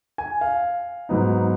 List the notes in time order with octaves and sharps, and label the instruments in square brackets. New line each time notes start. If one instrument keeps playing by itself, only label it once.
[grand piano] G#5
F5
G#2 F#3 B3 D#4